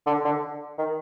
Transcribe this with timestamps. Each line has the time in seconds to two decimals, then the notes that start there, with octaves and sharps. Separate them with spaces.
0.07 D3
0.25 D3
0.79 D#3